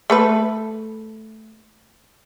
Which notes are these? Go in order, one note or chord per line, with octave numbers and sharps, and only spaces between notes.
A3 A4 B4